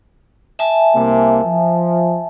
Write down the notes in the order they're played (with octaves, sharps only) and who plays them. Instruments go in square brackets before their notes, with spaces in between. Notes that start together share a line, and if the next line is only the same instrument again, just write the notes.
[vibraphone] E5 G#5 A5
[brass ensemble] C2 C3 A#3
F3